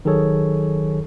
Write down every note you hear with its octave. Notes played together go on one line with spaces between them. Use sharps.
D#3 F#3 G#4 A4 C#5